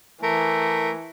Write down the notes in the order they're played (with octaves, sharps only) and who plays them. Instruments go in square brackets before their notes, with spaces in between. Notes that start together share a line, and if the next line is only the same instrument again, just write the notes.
[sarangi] E3 [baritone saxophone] A3 [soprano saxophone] A#4